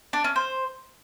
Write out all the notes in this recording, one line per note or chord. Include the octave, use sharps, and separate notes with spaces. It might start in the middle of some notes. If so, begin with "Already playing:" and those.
D4
C#4
C5